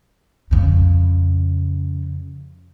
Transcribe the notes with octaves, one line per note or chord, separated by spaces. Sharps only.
F2 C#3